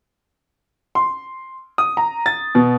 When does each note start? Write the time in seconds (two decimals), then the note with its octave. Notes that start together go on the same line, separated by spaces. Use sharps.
0.95 C6
1.78 D#6
1.97 A#5
2.26 A6
2.55 B2